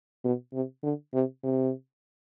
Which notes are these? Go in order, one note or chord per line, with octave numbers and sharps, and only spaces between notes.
B2
C3
D3
C3
C3